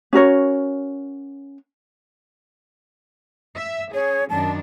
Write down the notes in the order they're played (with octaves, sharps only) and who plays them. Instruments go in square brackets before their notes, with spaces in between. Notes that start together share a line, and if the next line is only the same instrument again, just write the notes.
[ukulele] C#4 F#4 A#4 C#5
[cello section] E5
[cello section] C#4 G#4 [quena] C#5
[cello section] F#2 D#3 D4 [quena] A5